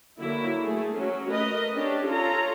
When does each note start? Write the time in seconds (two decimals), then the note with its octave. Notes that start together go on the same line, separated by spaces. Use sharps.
0.19 D3 F#3 A#3 E4
0.62 A3 G#4
0.97 F#3 C#4
1.29 A3 A#4 B4 D#5
1.74 C#4 D4 G4
2.06 F4 A4 C#5 A#5